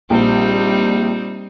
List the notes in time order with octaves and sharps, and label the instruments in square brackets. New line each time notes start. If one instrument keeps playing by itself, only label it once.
[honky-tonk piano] A#1 [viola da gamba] G3 C4 D#4